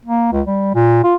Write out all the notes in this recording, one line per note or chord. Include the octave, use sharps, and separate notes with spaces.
A#3
C#2
G3
A#2
F4